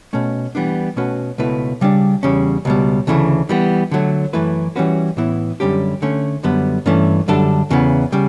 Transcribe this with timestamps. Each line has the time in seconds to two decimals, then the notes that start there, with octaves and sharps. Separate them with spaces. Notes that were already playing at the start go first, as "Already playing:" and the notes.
0.13 B2 A3 C#4
0.55 E3 G3 B3 D4
0.96 B2 A3 C#4 F#4 B4
1.38 C#2 B2 A3 E4 B4
1.81 C#3 G3 D4
2.23 E2 C#3 G3 C#4
2.65 C#2 B2 G3
3.07 D2 C#3 E3 A3
3.49 E3 G3 B3
3.91 D3 F#3 A3
4.33 F#2 E3 A3 E4 B4
4.76 E3 G3 C#4 F#4 B4
5.17 A2 E3 B3 E4
5.60 F#2 D3 G3 C#4 G4
6.02 D3 A3 C#4
6.43 F#2 D3 G3 B3
6.86 G2 E3 A3 C#4
7.28 F#2 D3 G3 D4 A4
7.70 E2 C#3 E3 B3
8.12 C#3 G3